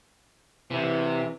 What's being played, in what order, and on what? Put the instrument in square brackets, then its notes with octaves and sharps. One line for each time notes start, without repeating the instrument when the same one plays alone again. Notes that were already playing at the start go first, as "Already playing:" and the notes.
[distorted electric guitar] C3 [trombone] E3